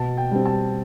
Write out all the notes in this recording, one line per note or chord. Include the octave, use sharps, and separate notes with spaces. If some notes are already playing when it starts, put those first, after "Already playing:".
Already playing: B2 A5
G5
G3 C4
A5